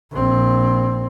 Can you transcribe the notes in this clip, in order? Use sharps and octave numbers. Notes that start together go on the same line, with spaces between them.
A#1 C4